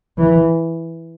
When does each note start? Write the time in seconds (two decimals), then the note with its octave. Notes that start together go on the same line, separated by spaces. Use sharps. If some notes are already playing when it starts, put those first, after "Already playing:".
0.18 E3